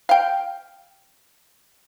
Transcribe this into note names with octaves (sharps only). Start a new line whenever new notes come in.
F5 G5